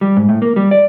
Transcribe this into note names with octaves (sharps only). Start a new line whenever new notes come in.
G3
G#2
A2
A#3
G3
D5